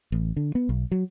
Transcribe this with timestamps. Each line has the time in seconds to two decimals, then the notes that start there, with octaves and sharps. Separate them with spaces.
0.12 A1
0.36 D3
0.55 B3
0.69 B1
0.92 F#3